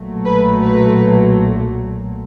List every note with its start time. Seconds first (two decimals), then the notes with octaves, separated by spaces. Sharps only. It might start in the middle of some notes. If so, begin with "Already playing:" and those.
Already playing: B1 A#2 F#3 A3
0.25 B4
0.61 B4